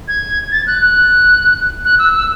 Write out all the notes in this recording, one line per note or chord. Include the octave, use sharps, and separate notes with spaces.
G#6
A6
F#6
F#6
F#6
E6
E6